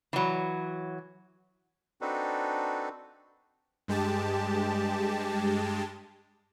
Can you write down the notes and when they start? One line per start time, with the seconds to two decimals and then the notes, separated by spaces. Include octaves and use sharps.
0.13 E3 F#3
2.01 C4 D4 D#4 F#4 A4 B4
3.88 G2 G#3 G4 A5